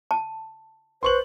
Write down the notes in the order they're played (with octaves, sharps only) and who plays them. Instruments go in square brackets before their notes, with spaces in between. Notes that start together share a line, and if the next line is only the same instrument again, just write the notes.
[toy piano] A5
[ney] B4 [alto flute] C5 [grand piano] C6 C#6 F#7